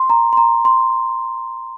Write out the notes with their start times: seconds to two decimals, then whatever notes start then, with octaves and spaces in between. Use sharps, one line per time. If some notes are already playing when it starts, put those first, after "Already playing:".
Already playing: C6
0.10 A#5
0.33 C6
0.37 A#5
0.65 C6